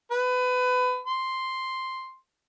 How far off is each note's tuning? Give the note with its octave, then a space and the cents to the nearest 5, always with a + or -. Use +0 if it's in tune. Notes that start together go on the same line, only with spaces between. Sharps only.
B4 +25
C6 +0